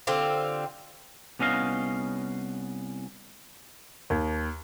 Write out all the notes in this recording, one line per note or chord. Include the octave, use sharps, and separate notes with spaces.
D3 C4 F4 G4
C2 B3 C#4 D#5 F5
D#2